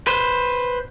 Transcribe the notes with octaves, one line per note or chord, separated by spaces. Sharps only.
B4 C5